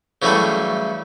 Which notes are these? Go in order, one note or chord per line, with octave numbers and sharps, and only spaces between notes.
C#3 E3 F#3 G3 A3 A4